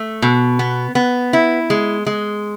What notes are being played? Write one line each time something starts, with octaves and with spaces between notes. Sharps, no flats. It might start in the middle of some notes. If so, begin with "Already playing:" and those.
Already playing: A3
B2
B3
B3
E4
G#3
G#3